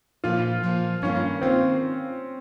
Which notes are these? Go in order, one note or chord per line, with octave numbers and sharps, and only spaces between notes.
A#2 F3 A#3 F4
A#2 F3 A#3
G2 D#3 A#3 C#4 F4
D#3 A#3 C4 F4